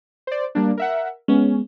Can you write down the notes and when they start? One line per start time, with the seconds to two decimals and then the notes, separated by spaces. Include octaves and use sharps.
0.27 C5 D5
0.55 G3 A#3 D4
0.77 A#4 E5 F#5
1.28 G#3 B3 C#4